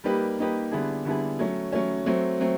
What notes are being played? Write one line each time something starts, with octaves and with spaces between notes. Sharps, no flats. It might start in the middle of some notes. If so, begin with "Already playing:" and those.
G3 A#3 D#4 G4 B4
G3 A#3 D#4 G4 B4
D3 G3 B3 E4 G#4
D3 G3 B3 E4 G#4
F#3 A3 C#4
F#3 A3 C#4
F#3 A3 C4
F#3 A3 C4